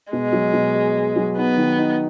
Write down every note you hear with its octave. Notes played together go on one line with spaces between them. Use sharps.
B2 G#3
F#3
B2
G#4
G#4
F#3
B3 D#4
D#3
D#4